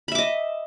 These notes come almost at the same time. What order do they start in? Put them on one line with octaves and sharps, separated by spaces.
B5 E5 D6 D#5